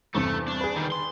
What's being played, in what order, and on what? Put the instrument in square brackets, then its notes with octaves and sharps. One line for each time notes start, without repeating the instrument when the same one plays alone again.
[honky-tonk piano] E2 G2 C3 [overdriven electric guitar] A3
[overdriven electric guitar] D4
[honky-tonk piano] G#4 B4
[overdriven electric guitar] D#3 G3
C6